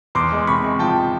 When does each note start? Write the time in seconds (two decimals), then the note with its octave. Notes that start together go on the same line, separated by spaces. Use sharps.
0.15 E2 C6 D6
0.32 G#3
0.47 C3 B5 C#6
0.64 G#3
0.79 F3 G5 A5